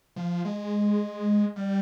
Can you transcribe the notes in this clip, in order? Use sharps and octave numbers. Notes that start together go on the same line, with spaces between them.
F3
G#3
G3